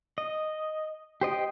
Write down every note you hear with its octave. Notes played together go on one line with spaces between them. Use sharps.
D#5
G4 C5 D#5 G5